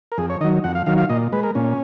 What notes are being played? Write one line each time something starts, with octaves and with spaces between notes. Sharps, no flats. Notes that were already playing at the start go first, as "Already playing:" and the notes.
A#4
F2 G#4
C#5
D#3 F#3 D#5
F2 F#5
F5
D#3 F#3 F5
F5
A#2 D#5
G#3 B4
A#4
A#2 C#4